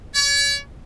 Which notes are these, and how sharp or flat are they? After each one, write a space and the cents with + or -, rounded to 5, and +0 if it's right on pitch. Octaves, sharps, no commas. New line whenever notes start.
C#5 +40